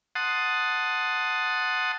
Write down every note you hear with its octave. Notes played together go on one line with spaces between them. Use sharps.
F#5 A5 C6 D#6